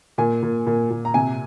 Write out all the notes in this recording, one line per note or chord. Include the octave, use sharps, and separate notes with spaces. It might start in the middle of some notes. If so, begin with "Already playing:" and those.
A#2 G#5
A#2
A#2
A#2
A#5
C3 G#5